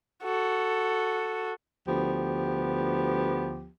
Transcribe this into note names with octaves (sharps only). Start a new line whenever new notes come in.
F#4 A4
D2 F3 B3 G4